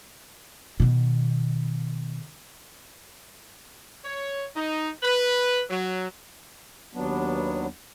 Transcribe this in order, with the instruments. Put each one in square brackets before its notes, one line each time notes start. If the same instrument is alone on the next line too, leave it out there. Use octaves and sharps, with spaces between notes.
[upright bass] B2 D#3
[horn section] C#5
D#4
B4
F#3
[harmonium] D#2 F#3 B3 D4